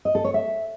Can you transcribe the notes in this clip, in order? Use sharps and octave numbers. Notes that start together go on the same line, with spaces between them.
D#5
A4
C#5
E5